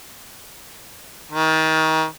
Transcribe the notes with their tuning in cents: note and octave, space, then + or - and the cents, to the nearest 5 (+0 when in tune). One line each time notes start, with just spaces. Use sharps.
D#3 +30